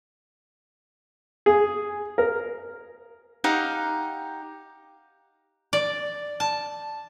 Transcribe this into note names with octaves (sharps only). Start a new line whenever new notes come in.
G#4
A#4
D#4 G4 F5 F#5
D5
A5